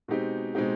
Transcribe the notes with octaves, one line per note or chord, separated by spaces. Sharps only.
B2 G#3 C4 D#4 G4
B2 G#3 C4 D#4 G4